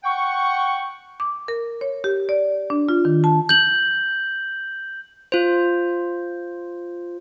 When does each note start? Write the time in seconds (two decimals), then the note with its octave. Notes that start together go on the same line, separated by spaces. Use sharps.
0.04 F#5 G5 C#6
1.20 D6
1.48 A#4
1.81 C#5
2.04 G4
2.29 D5
2.70 D4
2.89 F4
3.05 D#3
3.24 A5
3.49 G6 F#7
5.32 F4 C5